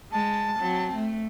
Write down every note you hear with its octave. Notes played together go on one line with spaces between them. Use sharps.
G#3 A5
F#3 C4
A3